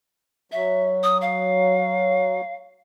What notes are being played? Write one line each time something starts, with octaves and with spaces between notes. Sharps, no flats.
F#3 E5
D#6
F5